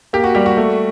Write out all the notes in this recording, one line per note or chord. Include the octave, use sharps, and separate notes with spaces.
A#3 G4
F#4
G3 G4
F#4
A3